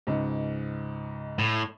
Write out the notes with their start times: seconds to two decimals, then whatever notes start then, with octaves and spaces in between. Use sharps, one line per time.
0.07 C#2 G#2
1.39 A2